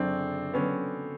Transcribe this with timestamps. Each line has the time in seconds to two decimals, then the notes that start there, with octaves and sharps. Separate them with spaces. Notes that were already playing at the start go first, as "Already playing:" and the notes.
Already playing: F#1 F#2 D3 F#3 C4 D4
0.53 D3 F#3 B3 C#4